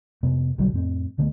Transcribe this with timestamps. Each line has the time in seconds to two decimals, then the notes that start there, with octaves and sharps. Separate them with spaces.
0.23 F2 C3 B3
0.58 B1 D3 F#3 G3
0.73 F2 A2 C4
1.18 C#2 D3 A3 B3